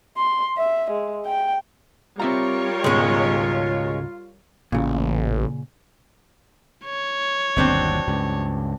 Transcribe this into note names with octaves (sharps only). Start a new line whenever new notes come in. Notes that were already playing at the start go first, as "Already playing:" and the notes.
C6
E5
G#3
G5
G3 C4 F4 A#4 C#5 E5 A#5
C#2 G#2 B2 G#3 C#4
A1 A#2 C#3
C#5
G1 D#2 B2 F#3 C4 D4
C#2 G2